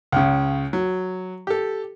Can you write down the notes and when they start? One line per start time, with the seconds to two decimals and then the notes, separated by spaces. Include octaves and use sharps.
0.12 C#2 C#3
0.73 F#3
1.47 G4 A4